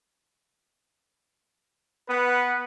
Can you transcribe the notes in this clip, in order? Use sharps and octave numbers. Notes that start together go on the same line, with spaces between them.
B3 B4 F#5